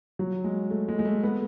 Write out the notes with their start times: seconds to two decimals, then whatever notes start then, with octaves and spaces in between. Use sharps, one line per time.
0.19 F#3
0.44 G#3
0.71 A3
0.88 G#3
0.99 G#3
1.05 A3
1.23 B3